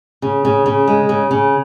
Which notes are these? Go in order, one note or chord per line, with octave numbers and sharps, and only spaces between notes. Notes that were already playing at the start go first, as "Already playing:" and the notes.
C#3
C#3
C#3
G#3
C#3
C#3